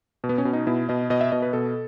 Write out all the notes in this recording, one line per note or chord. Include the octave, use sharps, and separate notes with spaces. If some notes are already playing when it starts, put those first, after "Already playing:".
B2
B3
C#4
B2
D#4
B2 E4
B2 D#5
B2 D#5
E5
B2 D#5
B4
B2 A4